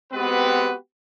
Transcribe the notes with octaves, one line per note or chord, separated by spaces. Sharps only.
G#3 B3 C4 F#4 G4 B4